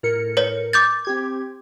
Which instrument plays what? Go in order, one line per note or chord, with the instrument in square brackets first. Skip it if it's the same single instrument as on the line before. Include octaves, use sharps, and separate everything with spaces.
[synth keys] A2 A#4 C#7
[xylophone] B4 C#5
D6 G6 A6
[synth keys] C4 G4 G#6